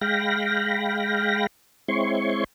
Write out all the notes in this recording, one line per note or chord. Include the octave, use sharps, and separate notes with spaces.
G#3 F5 G5 B5 A#6
G#3 C4 E4 C#5 C6 C#6